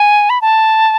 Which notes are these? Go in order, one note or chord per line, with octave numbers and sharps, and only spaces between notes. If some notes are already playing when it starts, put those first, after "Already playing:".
Already playing: G#5
B5
A5